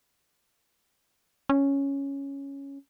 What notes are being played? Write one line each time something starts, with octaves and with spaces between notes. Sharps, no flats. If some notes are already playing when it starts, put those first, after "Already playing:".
C#4